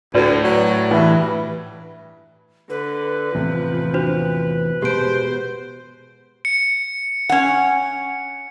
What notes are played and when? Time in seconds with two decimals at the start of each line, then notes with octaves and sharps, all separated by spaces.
0.15 D2 A2 F#4 B4 D5
0.44 F#3 D5
0.91 G2 E3
2.70 D3 B4
3.35 E2 A2 C3 F3
3.94 D4 F#4 C5
4.82 B2 G#3 G4 C5 D7
6.45 C#7
7.29 C#4 F#5